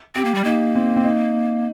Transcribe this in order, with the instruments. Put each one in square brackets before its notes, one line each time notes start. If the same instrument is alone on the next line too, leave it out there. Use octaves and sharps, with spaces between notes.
[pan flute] C4 [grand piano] G4
[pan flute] A#3
G3
[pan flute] A#3 [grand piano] D#4
[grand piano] C4
C4
D#4